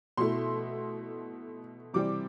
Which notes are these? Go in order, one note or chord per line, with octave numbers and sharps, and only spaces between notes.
B2 A3 E4 C6
C3 E3 G3 C4 D6